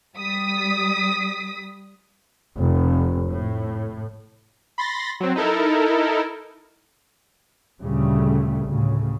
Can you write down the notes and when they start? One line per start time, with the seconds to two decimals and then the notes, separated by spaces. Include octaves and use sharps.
0.16 G3 D#6 B6
2.57 F1
3.30 A2
4.78 B5 C6 A6 A#6
5.20 F#3 C4
5.36 D#4 E4 A4 A#4
7.80 D2 A#2 C#3 G3 A3
8.66 D2 A2 C#3